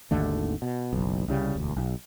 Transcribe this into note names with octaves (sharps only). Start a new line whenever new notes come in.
G#1 D#2 D3 A3
B2
F#1 B1
C2 C#3 G3
E1 D2
B1